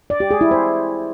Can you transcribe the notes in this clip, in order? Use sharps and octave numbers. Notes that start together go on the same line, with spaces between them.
D5
G4
G#4
E4
C5